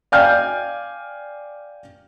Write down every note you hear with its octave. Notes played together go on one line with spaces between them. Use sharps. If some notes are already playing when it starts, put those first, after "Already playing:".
D5 F5 G5 G#5 F6 G6